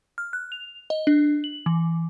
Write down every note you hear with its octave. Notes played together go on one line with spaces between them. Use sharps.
F6
F#6
F7
D#5
D4
F#7
E3